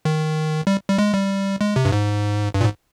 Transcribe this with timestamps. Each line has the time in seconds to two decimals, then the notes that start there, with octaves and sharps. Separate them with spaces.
0.05 D#3
0.67 G3
0.89 G3
0.98 G#3
1.14 G3
1.61 G#3
1.76 C3
1.85 G2
1.92 G#2
2.54 G2
2.61 A#2
2.64 G#2